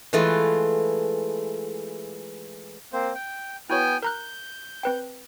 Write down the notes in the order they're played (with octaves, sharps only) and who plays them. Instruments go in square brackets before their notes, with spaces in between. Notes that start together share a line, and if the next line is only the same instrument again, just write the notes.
[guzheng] E3 G#3 A3 F4 B4
[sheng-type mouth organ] A#3 C4 C5
G5
[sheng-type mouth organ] B3 G5 G#5 [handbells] E4 F#4 C#5
[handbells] A#4 A#5 F#6 [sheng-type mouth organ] G6
[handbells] C4 B4 G5